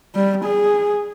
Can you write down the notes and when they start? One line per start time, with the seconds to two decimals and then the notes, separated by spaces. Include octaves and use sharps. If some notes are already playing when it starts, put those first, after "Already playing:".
0.15 G3
0.45 G#4